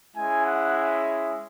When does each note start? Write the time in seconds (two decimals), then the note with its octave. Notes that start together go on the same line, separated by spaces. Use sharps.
0.16 G#3 C#4 E4 G#5
0.46 F#5